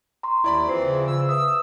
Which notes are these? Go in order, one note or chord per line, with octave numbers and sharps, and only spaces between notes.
A#5 C6 C#6
D#2 E4 D5 B5
E3 F3 C4 G#4 C5 C7
C#3
E6
B4 E5 D#6 E6